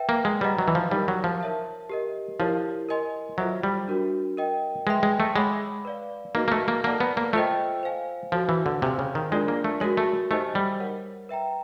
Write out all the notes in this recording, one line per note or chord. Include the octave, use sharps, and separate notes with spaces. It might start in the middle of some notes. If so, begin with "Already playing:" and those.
Already playing: B4 E5 G5
A#3
G#3
G3 B4 D#5 F#5 A#5
F#3
E3
F3
G3 D#4 G4 A#4
F#3
F3
A#4 C#5 E5 A5
G4 A#4 D#5
F3 E4 G4 A#4 C#5
A#4 D#5 G#5 C6
F#3 F4 A4 C5 E5
G3
D4 F#4 A#4
A#4 D#5 G5
G#3 B4 E5 G5 C6
G#3
A3
G#3 C#5 F#5 B5 D6
B4 D5 F5
A#3 D#4 F#4 B4 D#5
A#3
A3
A#3
A#3 A4 D5 F#5 A5
B3
A#3
A3 F4 A4 C5 D#5 G5
C5 F5 G#5
F3 F#4 A4 C#5
E3
D3
C3 C5 F5 G#5 C6
C#3
D#3
G#3 D4 F4 A#4 D5
A#3
A3
G#3 F#4 A#4 C#5
A3
A3 D#4 G4 C5 D#5 G#5
G3
A#4 C#5 F#5
B4 E5 G5 A#5